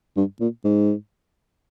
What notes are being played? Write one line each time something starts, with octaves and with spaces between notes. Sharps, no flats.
G2
A#2
G#2